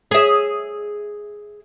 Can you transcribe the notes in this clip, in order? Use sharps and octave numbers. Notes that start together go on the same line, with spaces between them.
G#4 E5